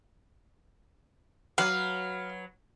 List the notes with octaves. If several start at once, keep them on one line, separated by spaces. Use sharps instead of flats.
F#3 B4 F5